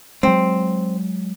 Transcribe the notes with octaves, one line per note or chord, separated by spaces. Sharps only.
F#3 G#3 C4